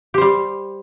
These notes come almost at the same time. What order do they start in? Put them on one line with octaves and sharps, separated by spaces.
G4 C5 G3